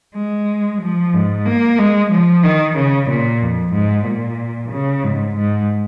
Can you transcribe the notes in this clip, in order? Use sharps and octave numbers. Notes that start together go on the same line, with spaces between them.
G#3
F3
G#2
A#3
G#3
F3
D#3
C#3
A#2
F2
G#2
A#2
C#3
G#2
G#2